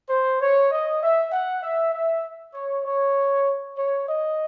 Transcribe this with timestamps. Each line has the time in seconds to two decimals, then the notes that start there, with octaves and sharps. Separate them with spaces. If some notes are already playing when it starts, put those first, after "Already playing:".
0.10 C5
0.41 C#5
0.71 D#5
1.02 E5
1.32 F#5
1.63 E5
1.94 E5
2.54 C#5
2.85 C#5
3.77 C#5
4.08 D#5